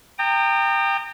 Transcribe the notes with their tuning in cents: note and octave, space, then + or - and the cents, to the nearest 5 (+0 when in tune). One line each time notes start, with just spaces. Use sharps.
G5 +15 A#5 -30 D#6 -35